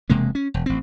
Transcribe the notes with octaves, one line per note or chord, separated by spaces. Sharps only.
E1 C3 G#3 A#3
C#4
E1
A1 C4